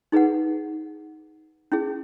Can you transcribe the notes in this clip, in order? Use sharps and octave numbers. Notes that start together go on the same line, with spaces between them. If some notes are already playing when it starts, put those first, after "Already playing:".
D#4 G#4 B4 F#5
C#4 E4 G#4